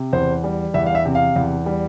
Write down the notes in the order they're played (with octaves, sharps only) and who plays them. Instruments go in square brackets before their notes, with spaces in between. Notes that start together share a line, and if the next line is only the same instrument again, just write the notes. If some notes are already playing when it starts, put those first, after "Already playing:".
Already playing: [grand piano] C3
E2 C5
G3
E2 E5
F5
E5
C3
F5
E2
G3